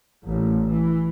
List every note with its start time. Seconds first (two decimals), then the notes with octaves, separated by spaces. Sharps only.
0.23 A1 A#2
0.66 E3